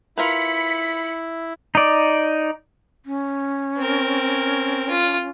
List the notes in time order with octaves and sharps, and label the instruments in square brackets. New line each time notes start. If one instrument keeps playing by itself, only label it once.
[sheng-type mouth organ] E4 [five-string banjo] F4 A#4 B4 [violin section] B5 B6 C#7
[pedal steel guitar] D#4 D5
[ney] C#4
[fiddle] C4 A#4
F4